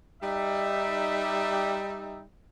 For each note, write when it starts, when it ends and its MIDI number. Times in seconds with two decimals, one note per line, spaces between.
0.23 2.23 55
0.23 2.23 63
0.23 2.23 76